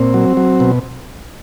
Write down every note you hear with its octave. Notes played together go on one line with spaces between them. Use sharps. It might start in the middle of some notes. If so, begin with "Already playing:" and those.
Already playing: A#2 C4
F#3
F#3
B2